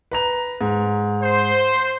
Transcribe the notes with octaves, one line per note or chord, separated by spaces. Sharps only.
B4 A#5 F7
G#2
C5